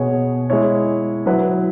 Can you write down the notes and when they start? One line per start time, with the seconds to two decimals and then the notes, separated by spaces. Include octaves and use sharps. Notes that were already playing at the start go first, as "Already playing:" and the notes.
Already playing: B2 B3 G#4 C#5
0.50 G#3 E4 C#5
1.26 F#3 E4 B4